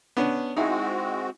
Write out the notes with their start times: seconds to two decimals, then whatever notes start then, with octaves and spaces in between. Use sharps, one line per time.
0.17 B3 C#4 D4
0.57 G#3 C4 D#4 E4 F#4 G#4